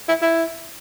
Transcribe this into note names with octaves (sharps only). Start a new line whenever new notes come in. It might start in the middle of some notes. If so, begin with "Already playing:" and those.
E4
E4